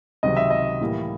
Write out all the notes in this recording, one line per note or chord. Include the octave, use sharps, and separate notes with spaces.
C#2 C3 D#3 F#3 D#5
E5
D#5
A2 E3 G3 A#3